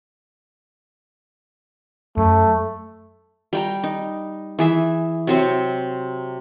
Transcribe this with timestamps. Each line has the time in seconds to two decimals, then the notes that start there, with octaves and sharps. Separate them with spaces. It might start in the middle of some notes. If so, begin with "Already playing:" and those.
2.18 F#2 A3
3.53 G3 G5 A#5
3.84 D#4
4.59 E3 G#4 E5
5.27 C3 F#3 C4